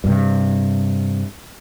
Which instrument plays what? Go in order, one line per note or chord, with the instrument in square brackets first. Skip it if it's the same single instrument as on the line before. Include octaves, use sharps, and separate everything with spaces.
[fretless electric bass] G2 C3